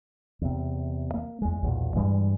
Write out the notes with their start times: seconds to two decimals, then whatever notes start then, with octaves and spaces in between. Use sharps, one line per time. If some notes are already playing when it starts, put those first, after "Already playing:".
0.42 E2 C3
1.14 A#3
1.42 E2 G#3
1.62 B1 E2 A#2
1.96 G2 E3 G3 G#3